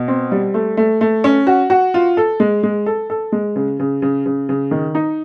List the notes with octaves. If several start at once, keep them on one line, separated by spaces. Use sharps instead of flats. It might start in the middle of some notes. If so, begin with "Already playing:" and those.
Already playing: B2
C4
G3
A3
A3
A3
C#4
F#4
F#4
F4
A4
G#3
G#3
A4
A4
G#3
C#3
C#3
C#3
C#3
C#3
D#3
D#4